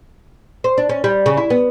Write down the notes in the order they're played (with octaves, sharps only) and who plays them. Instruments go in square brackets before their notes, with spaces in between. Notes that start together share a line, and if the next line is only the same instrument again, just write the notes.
[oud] C5
D4
C#4
G3
C#3
E4
B3